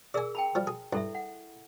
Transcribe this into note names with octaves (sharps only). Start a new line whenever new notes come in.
G#4 A#4 D5 G#5 E6
G5 A5 B5
F3 G3
G#4
G2 E4 A4 E5
F#5